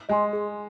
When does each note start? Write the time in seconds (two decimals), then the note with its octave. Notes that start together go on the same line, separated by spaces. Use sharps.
0.09 G#3 D#5 G#5 C6
0.33 G#4